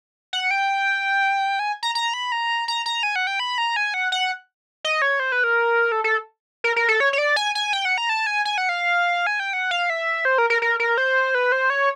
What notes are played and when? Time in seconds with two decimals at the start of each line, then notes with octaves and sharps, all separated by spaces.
0.33 F#5
0.51 G5
1.59 G#5
1.83 A#5
1.95 A#5
2.14 B5
2.32 A#5
2.68 A#5
2.86 A#5
3.03 G#5
3.16 F#5
3.27 G5
3.40 B5
3.58 A#5
3.76 G#5
3.94 F#5
4.12 F#5
4.84 D#5
5.02 C#5
5.20 C5
5.32 B4
5.44 A#4
5.92 A4
6.04 A4
6.64 A#4
6.76 A#4
6.89 A4
7.00 C#5
7.13 C#5
7.18 D5
7.36 G#5
7.55 G#5
7.73 G5
7.85 F#5
7.98 A#5
8.09 A5
8.27 G#5
8.45 G#5
8.58 F#5
8.69 F5
9.27 G#5
9.40 G5
9.53 F#5
9.71 F5
9.90 E5
10.25 C5
10.38 A#4
10.50 A#4
10.62 A#4
10.80 A#4
10.98 C5
11.35 B4
11.52 C5
11.70 C#5